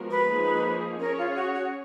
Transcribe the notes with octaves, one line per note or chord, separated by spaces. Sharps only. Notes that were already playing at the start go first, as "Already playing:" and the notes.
Already playing: F3 G#3 B3 F#4 A#4
B4
F3 A#3 D#4 G#4
C#4 G#4 A#4 C#5
F4
F#4
F#4